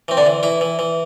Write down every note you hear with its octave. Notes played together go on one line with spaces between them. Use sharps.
E3 C4
D3 D4
E3
E3 E4
E3
E3